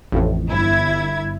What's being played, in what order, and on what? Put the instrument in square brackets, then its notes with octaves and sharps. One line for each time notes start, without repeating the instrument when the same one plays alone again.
[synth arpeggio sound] A1 F2 A2
[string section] G1 E4 G#6